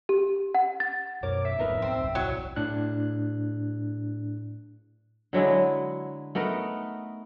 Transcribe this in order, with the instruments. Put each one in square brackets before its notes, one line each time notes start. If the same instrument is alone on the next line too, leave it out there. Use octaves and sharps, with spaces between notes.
[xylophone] G4
F#5
A6
[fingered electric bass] F#2 B2 [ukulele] A#4 C#5 [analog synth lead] D6
[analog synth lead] E5
[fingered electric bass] E1 A2 B3 [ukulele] D#4 A#4 B4
[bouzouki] C4
[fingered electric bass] D1 B1
[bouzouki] F#3 [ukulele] E4
[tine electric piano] A2 D4 F#6
[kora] D3 F#3 G#3 E4
A3 B3 D#4 A#4